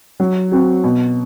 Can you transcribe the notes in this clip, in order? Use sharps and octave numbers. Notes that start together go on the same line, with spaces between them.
F#3
C4 F#4
B2